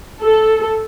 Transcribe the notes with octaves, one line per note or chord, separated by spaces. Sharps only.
A4